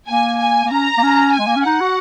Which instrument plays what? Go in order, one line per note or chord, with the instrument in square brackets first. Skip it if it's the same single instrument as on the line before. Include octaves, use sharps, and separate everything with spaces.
[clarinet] A#3 [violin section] G#5
[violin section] G#5
[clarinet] A#3
[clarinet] C#4 [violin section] A#5
[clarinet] A#3
C#4
[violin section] G#5
[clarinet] G#3
A#3
C#4
[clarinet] D#4 [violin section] F#5
[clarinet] F#4